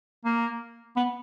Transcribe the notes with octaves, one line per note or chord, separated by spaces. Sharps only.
A#3
B3